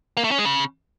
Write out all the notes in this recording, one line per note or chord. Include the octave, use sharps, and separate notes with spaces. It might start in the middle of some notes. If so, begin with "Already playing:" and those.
A#3
A3
C#4
G#3
C#3